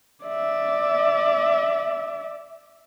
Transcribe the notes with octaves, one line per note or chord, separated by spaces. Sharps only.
D5 E5